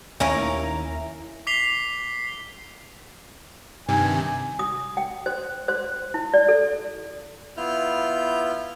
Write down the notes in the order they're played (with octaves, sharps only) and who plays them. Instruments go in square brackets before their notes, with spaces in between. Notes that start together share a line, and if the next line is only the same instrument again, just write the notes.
[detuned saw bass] D#2 [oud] C#4 [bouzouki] E4 A#4 F5
[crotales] D6 B6 C7 F7 G7
[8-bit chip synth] G2 C3 D#3 [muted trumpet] G#5
[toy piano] D#6
G5
C5
C5
E4
D5
A4
[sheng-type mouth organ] B3 E4 F4 F6 G6